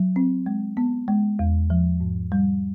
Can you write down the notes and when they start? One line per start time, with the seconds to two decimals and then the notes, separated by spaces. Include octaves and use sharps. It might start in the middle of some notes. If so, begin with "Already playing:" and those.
Already playing: F#3
0.16 C4
0.46 G#3
0.77 B3
1.08 G#3
1.39 E2
1.70 F3
2.00 G#2
2.32 G3